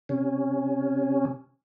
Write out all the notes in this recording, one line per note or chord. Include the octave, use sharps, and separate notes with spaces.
C3 C#4